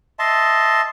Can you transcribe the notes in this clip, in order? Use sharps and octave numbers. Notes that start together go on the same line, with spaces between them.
D#5 E5 A5 C6